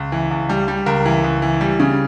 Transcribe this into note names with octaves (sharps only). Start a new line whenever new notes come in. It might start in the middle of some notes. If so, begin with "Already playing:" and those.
Already playing: C#2
E3
C#2
G3
G3
C#2 A#4
E3
C#2
E3
G3
C#3